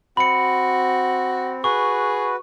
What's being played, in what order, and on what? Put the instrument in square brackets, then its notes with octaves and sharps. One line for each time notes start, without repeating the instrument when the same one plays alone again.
[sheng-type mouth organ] C4 [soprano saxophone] F#4 [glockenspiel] B5 C#7
[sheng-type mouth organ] F#4 B4 [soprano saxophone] G#4 [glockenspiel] C#6